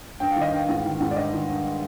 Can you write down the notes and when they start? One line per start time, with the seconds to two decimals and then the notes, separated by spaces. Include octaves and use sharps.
0.20 G2 G5
0.31 F5
0.36 D#3
0.41 D#5
0.52 G2 F5
0.69 G#2
0.84 D#3
1.01 G#2
1.11 D5
1.16 G2 D#5
1.33 D#3
1.49 G2